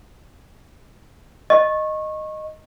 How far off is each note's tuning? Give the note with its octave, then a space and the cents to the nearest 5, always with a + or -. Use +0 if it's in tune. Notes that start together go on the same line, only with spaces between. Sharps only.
D#5 -10 C#6 -25